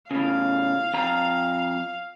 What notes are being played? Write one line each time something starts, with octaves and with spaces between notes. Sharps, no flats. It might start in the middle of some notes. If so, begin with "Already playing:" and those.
A2 C#3 F5
F2 A#5